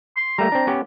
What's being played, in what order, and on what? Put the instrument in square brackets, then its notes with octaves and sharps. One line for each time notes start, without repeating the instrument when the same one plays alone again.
[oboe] C6
[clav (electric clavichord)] G3 A3 A#3 [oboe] A#5
[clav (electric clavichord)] C4 D4
B3 C#4 G4